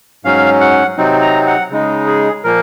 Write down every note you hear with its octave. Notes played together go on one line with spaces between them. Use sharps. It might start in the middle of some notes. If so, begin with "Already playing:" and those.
G#2 F#3 C#4 F5
F#5
C3 F#3 C4 D#4
A#5
F#5
C#3 G#3 D#4
G#4
A#2 F3 A#3 A#4